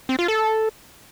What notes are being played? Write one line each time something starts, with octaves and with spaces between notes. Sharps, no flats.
C4
F4
A4